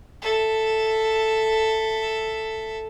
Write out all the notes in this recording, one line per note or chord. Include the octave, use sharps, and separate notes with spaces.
A4 E5